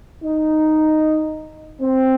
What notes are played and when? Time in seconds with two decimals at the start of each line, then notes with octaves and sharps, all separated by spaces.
0.24 D#4
1.81 C4